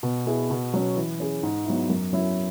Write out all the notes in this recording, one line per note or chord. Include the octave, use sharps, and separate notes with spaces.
B2
B3 E4 G#4
B2
F#3 C#4
E3
C#4 G#4
G#2
F#3 B3 E4
F#2
F#3 C#4 E4